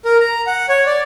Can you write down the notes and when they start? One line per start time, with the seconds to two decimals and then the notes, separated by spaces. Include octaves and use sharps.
0.05 A#4
0.20 A#5
0.47 F#5
0.69 C#5
0.86 D5